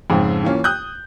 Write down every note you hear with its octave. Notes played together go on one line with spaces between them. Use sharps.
F2 G#2 C#3
E3 A#3 C#4 F4
D#6 F#6 G6